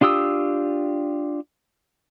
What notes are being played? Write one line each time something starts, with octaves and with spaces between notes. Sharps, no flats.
D4 F4 G4 D#6 E6